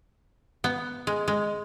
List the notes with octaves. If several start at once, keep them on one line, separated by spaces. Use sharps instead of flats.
B3
G#3
G#3